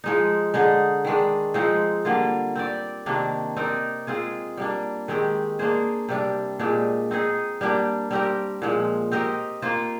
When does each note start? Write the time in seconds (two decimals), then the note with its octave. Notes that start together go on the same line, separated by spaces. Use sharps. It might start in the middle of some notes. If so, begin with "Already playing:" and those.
0.04 F3 G#3 D#4
0.54 D3 G#3 D#4
1.05 D#3 G#3 D4
1.54 F3 G#3 C4 D#4
2.05 D3 G3 A#3 F4
2.55 C4 G4 D5
3.06 C3 D#3 A#3 D4
3.56 C4 D#4 A#4 D5
4.07 G#3 C4 F4 G#4
4.58 G3 A#3 D4
5.08 D#3 G#3 C4 G4
5.59 A#3 D4 G#4 C5
6.09 C3 G3 D4
6.59 A#2 G#3 D4 G4
7.11 C4 D#4 G#4
7.61 G3 A#3 D4 G4
8.11 G3 C4 G4 A#4
8.62 A#2 F3 G#3
9.12 C4 G4 A#4 D#5
9.62 A#3 F4 C5